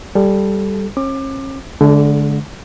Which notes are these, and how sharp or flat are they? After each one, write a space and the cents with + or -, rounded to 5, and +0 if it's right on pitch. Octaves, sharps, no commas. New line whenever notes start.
G3 +0 A4 -15
C#4 -40 D6 +25
D3 -15 G#3 +40